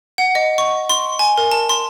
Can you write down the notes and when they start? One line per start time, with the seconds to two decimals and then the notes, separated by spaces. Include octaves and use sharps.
0.18 F#5
0.35 D#5
0.58 C#6
0.89 C6
1.19 G#5
1.38 A#4
1.51 A5
1.69 C6